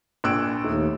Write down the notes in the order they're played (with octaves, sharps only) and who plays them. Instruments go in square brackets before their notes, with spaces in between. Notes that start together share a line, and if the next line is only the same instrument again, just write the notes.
[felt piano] A#1 E6 D7 [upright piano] A#2 F#6 G#6
[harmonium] D#2 [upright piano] A3 D#4